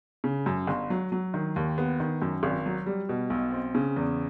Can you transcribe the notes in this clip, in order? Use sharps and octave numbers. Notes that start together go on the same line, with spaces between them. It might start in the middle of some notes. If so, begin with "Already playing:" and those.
C#3
F#2
G1
F#3
F#3
D#3
D#2
B3
D#3
F#2
G#1
F#3
G3
B2
B1
C4
C#3
E2